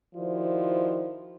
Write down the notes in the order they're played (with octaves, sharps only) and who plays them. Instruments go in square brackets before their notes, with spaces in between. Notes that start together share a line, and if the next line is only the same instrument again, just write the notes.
[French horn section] D#3 F3 E4 F#4 C5 D5